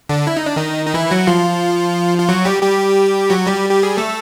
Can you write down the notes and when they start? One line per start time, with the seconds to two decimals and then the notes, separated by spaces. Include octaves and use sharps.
0.09 D3 D4
0.27 E4
0.37 D#4
0.46 D4
0.56 D#3 D#4
0.86 D#4
0.94 E3 E4
1.11 F#3 F#4
1.27 F3 F4
2.18 F4
2.29 F#3 F#4
2.45 G3 G4
2.63 G3 G4
3.30 F#3 F#4
3.46 G3 G4
3.69 G4
3.83 G#4
3.97 A3 A4